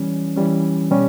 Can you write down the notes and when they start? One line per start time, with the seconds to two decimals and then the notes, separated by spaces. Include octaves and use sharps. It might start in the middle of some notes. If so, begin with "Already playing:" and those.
Already playing: E3 G3 C#4
0.37 E3 G3 C#4
0.91 B2 G3 C#4 G4